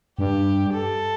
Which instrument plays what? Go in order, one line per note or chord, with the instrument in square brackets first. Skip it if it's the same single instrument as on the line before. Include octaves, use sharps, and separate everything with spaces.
[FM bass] G2 [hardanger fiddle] G4
[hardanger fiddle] A4